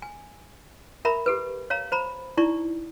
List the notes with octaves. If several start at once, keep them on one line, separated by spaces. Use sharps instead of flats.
G#5
A#4 E5 A#5 B5
G4 A4 B4
C#5 F5 A#5
C5 A#5 B5
D#4 E4 D5 A#5 C#6